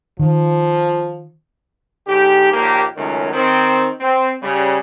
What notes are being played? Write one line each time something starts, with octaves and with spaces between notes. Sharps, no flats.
D#3 F3
G#2 D3 G4
A#1 D#2 A#3 G4
C#2 F#2 D#3 A3 C#4
D#3 C4
C4
C#3 G3